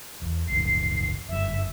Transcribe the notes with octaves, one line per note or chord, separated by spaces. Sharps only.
E2
F#1 C#2 G#2 C7
F#1 G2 E5